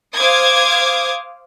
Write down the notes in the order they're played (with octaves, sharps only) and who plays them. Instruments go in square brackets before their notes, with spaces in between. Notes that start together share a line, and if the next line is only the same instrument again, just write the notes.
[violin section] C5 F5 D6 D#6 G#6